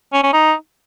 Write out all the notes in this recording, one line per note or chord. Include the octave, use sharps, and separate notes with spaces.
C#4
C#4
D#4